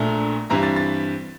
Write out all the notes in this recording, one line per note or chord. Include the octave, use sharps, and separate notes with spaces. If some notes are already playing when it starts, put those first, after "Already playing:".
Already playing: A#1 A#2 A3 D4 A#5
G2 E3 G3 C4 E4 A#5
A6
A6